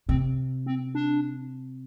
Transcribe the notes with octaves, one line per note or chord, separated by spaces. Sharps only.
C3 C4
C4
D4